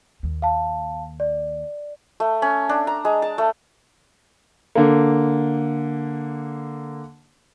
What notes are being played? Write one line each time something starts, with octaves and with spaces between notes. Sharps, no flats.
D#2
F5 A5
D5
A3
C#4
D4
A#5
G#3
A5
A3
D3 A#3